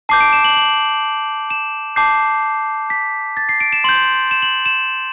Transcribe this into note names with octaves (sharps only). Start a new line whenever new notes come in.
A5 D6 G6 C7
D7
E7
F#7
F#7
E7
A5 D6 G6 C7
B6
A6
C7
D7
E7
C6 G6 F#7
E7
F#7
E7